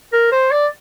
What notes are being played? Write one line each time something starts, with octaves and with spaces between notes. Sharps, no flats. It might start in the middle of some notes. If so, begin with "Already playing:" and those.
A#4
C5
D5